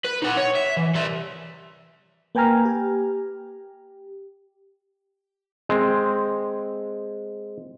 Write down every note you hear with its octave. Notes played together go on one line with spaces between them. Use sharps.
B4
D#4 F#5
C#5
E5
E3
G3 E5
A#3 B4 G5 G#5 A#5 F6
G4
G#3 C4